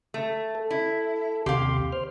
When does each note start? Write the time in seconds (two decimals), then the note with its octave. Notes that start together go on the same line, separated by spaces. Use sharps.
0.14 A3
0.55 A4
0.70 E4
1.46 D#2 C3 G4 F5 C6
1.93 C5 F6